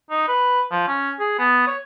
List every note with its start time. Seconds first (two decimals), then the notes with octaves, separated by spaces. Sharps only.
0.11 D#4
0.28 B4
0.71 F3
0.88 C#4
1.20 G#4
1.39 B3
1.67 C#5